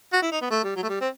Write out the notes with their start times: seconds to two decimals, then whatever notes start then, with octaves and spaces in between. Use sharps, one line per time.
0.13 F#4
0.22 E4
0.32 D#4
0.41 B3
0.51 A3
0.63 G3
0.76 F#3
0.83 A3
0.89 G3
1.01 C4